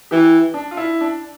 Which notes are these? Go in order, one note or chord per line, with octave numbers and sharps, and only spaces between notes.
E3 G4
D4
F4
E4
D4